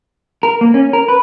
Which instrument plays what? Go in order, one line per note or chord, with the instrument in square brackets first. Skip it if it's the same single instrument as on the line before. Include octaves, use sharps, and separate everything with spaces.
[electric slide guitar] A#4
A#3
C#4
A#4
B4